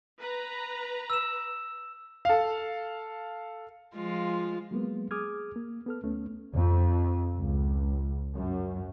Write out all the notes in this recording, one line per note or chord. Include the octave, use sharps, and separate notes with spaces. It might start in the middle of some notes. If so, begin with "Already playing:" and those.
B4 A#5
E6 E7
A4 F5
F3 G#3 F4
F#3 G#3 A#3 B3
G#4 D6 D#6 F6 G#6
A#3
B3 A4 F6
D2 A3 B3 C#4
F2
C#2
F#2